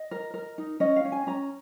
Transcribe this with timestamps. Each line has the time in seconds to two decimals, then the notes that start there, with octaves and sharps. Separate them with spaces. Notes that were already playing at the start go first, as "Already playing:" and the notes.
Already playing: D#5
0.11 A#4
0.34 A#4
0.58 D#4
0.80 C#4 D#5
0.96 F5
1.05 C#4
1.12 G#5
1.27 C#4 A#5